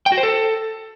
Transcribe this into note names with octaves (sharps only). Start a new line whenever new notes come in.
G5
F#4
C5
A4